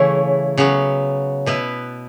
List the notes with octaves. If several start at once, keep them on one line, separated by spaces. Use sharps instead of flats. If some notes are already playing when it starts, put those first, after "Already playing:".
Already playing: C#3 E3 A3 E4 C#5
C#3 F#3 B3
B2 B3 E4 B4